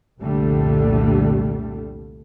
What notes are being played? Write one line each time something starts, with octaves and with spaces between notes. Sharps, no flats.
C2 F2 A#2 D3 G3 A3